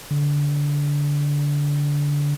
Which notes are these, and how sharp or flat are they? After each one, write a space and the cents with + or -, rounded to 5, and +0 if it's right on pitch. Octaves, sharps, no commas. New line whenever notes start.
D3 -20